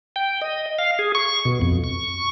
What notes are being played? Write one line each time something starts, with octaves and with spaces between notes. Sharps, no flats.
G5
D#5
F5
G#4
C#6
B2
F2
C#6